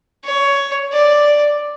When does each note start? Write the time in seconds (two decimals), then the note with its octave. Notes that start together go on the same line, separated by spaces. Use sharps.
0.25 C#5
0.93 D5